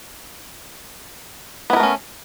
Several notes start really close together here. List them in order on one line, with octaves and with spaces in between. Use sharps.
B3 E4 A#4 A3 C#4